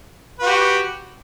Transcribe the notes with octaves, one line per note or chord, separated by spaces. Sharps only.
F#4 G4 B4